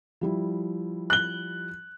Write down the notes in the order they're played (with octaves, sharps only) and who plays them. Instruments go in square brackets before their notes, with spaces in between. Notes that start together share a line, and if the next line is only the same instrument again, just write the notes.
[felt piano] F3 G3 E4
[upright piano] F#6 G7